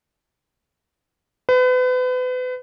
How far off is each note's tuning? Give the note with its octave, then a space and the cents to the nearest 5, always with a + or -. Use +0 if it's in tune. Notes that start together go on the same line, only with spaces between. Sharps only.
B4 +35